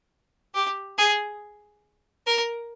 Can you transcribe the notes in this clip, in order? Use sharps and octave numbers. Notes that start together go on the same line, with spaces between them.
G4
G#4
A#4